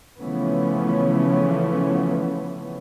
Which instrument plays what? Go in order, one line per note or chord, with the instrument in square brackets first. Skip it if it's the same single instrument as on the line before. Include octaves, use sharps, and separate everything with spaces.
[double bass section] C#3 E3 F3 A3 B3 C#4